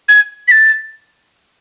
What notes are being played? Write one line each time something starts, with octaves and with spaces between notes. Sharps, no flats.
G#6
B6
A6